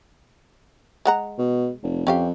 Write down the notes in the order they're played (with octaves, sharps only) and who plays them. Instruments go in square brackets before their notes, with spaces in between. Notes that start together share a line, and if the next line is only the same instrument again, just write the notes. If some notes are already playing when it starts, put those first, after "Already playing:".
[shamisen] G#3 F#5 A#5
[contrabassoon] B2
F1
[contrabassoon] F2 [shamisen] C#4 G4 F5